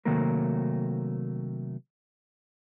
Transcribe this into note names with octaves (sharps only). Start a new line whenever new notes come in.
C3 D#3 F#3 A3 A#3 A#4